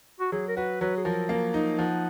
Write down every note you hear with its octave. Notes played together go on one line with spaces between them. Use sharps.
F#4
F#3 G#4
A#4
F#4 B4
F#3 B4
G#4
F3 A#4
A#3
D#4
F3 F#5